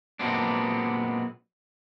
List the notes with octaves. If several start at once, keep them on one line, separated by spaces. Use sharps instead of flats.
A#2 F#3 G#3 B3 C4 D4